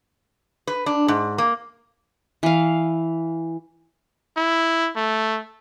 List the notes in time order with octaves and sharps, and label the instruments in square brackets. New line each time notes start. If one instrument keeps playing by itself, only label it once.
[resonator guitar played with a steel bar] B4
D4
G#2
A#3
[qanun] E3 F5
[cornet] E4
A3